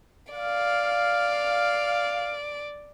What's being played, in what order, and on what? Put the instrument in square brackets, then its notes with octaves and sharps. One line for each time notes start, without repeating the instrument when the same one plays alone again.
[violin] D5 [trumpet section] F5